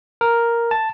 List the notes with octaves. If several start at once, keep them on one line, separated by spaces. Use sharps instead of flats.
A#4
A5